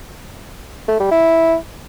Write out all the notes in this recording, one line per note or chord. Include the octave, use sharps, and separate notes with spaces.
A3
G3
E4